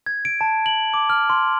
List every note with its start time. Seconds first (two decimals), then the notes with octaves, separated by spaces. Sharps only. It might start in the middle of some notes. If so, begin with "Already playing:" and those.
0.06 G#6
0.25 D7
0.41 A5
0.66 F#7
0.94 D6
1.10 F6
1.30 C6